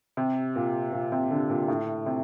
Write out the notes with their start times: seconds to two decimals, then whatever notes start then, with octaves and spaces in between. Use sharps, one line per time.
0.17 C3
0.56 A#2
0.93 A#2
1.12 C3
1.31 D3
1.50 A#2
1.68 A2
2.06 C3